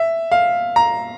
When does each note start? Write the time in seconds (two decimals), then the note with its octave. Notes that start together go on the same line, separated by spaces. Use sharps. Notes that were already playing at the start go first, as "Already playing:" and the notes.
Already playing: E5
0.32 F5
0.76 A#5